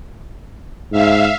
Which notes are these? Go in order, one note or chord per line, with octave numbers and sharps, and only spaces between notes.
G#2 E5 F5